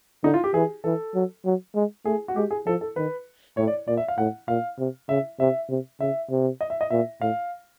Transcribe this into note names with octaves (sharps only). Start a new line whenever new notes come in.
D3 D#4
F4
G4
E3 G#4
E3 A4
F#3
F#3
G#3
A3 G#4
F#4
G#3 G4
G#4
F3 A4
A4
D#3 B4
A2 C#5
D5
A#2 D5
E5
F5
A2 F#5
A#2 F5
C3
C#3 E5
C3 E5
C3
C#3 E5
C3
D#5
E5
D#5
A#2 E5
A2 F5